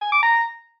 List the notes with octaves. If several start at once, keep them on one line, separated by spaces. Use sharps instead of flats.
G#5
D6
A#5